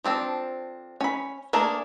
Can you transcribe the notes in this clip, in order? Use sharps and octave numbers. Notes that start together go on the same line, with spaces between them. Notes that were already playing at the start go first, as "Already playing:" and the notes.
F3 C4 D4 A4
C#4 B5
A3 A#3 D4 G#4 A#5